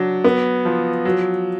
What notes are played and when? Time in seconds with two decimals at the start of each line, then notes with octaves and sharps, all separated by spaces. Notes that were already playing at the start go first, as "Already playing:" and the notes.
Already playing: F#3 D4
0.24 B3
0.65 F3
1.05 F#3